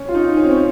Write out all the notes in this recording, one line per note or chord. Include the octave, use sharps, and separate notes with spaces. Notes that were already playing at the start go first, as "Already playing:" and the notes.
Already playing: C#4
F4
D#4
C#4
C4
C#4